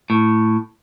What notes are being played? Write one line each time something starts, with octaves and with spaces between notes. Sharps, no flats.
A2